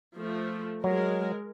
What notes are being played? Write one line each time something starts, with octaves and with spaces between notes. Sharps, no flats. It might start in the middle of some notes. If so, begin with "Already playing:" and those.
F3 A3
F#3 G#3 A#4